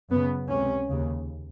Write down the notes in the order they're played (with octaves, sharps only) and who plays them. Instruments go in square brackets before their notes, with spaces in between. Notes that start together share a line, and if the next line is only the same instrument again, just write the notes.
[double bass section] F#2 C#3 B3
C#2 C3 C#4
D#2 C#3